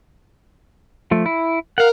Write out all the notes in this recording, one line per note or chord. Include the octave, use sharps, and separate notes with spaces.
F3 A3
E4
A#4 F5 F#5